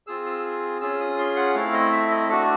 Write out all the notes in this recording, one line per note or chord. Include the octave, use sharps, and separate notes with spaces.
C4 F4 G#4 E6
E6
C#4 F4 G#4 E6
D#6
C6
F#5
A3 C4 E4 F5
D#5
E5
D#5
A3 D4 F#4 A4